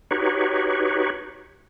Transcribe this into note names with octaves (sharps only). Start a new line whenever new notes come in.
D#4 F#4 G4 B4 C#5